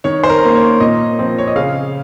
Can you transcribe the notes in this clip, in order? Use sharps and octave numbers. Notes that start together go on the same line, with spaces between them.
D#3 C#5
C5
A#4
A#3 C#4
C#5
A#2 D#5
F3 C4
C#5
D#5
C#3 F5